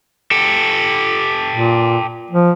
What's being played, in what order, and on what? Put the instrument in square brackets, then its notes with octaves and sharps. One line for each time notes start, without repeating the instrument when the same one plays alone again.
[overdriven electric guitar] G4 A4
[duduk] A#2
F3